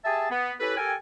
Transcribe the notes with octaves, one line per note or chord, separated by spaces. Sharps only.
G4 G#4 E5 G#5 A5
B3
C#4 E4 G4 A4 B4
G4 A4 A#4 G5 G#5